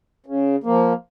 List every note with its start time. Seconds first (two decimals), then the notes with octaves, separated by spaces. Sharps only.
0.26 C#3
0.64 F3 A#3